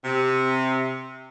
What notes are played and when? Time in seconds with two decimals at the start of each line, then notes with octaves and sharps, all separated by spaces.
0.04 C3